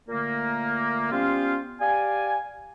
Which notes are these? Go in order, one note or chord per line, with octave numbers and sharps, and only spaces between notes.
A#2 D3 A3 A#3
G3 B3 C#4 F4 C5 F5
G4 D5 F5 G#5